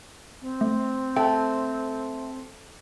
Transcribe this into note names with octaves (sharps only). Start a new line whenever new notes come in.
C4
A3
A3 G5